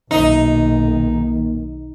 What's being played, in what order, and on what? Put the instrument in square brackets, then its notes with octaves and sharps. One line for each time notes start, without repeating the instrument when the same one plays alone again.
[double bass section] B1 D#3 [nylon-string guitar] A#2 A#3 E5 [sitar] D#4